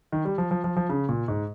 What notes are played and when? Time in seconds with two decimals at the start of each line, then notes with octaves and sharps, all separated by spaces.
0.12 D#3
0.25 G3
0.38 F3
0.51 F3
0.64 F3
0.76 F3
0.89 C#3
1.09 A#2
1.28 G#2